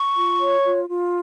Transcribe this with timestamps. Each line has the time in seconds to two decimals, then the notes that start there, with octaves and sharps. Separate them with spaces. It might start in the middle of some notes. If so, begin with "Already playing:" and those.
Already playing: C#6
0.16 F4
0.40 C#5
0.65 F4
0.89 F4